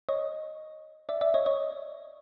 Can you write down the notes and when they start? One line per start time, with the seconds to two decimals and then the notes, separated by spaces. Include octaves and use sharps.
0.09 C#5 D#5
1.09 D5 E5
1.21 D5 E5
1.34 C#5 D#5
1.46 C#5 D#5